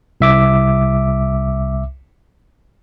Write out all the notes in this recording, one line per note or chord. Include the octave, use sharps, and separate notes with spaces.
C2 E5 D6